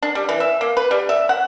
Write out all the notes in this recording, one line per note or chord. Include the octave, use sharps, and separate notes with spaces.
D4
G3
E3
E5
A#3
B4
G3
E5
F#5